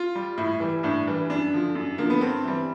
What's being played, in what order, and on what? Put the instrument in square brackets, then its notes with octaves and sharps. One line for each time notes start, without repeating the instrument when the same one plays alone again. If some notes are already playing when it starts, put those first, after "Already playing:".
Already playing: [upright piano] F4
G3
A2 E4
E3 G3
A2 D4
E3 G3
F#2 D4
D3 F3
F#2
D3 F3 A#3
B3
G2 C4
E3 G3